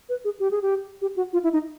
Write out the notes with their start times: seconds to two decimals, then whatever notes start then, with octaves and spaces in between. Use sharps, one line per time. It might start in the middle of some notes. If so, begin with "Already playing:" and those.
0.09 B4
0.24 G#4
0.40 G4
0.51 G#4
0.62 G4
1.02 G4
1.16 F#4
1.33 F4
1.43 E4
1.53 D#4